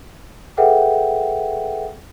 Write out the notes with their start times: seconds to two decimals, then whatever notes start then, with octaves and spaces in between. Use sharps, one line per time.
0.57 G#4 A4 B4 E5 F#5 G5